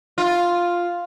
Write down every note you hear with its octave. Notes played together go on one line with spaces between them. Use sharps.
F4